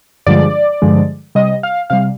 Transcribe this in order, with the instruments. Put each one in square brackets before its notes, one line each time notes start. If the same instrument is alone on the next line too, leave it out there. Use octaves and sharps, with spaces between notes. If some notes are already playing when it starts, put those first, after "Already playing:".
[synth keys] G2 D3 F3 G#3 D5
G2 D3 F3 G#3
C3 G3 D#5
F5
C3 G3 F5